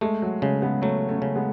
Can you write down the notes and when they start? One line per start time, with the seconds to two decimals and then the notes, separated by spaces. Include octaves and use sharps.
0.01 G#3 A3
0.22 F#3
0.42 C#3 G#3
0.62 G#3 B3
0.82 F#3 A3 C#4
1.09 A3 C#4
1.22 C#3
1.35 G#3 B3